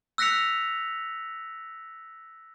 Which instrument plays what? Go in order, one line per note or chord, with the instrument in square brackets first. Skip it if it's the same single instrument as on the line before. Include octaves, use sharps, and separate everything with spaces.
[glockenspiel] E6 F#6 A#6 B6 C#7 F7